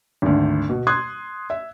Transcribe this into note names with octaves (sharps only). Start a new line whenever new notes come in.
G#1 D2
B2
C6 D#6 F#6 G#6
E5